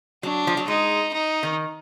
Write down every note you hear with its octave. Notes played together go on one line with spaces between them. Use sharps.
F#3 D4
F3
F#3
G#3 D#4
D#4
D#3